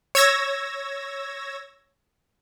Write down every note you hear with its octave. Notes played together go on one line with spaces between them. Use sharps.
C#5 E6 G#6 A#6